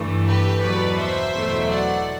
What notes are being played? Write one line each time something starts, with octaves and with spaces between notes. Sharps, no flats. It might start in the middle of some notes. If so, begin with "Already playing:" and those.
Already playing: G2 E3 A3
G4 B4
E2 B2 F#3 B4 D5
C5 E5
E2 B2 F#3 A3
D5 F#5